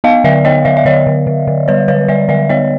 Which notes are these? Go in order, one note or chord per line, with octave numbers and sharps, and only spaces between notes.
B3 D#5 F5
D3 D5 E5
B3 C#5 D#5
D3 D5 E5
E5
D3 C#5 D#5
D3
D3
D3
G3 B4 C#5
D3 B4 C#5
G3 D5 E5
D3 D5 E5
B3 C#5 D#5